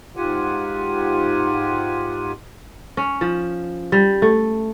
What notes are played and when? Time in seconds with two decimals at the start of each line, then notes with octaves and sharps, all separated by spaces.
0.17 G#2 F4 G4 F#5 G#5
2.97 C#4
3.21 F3
3.92 G3
4.22 A3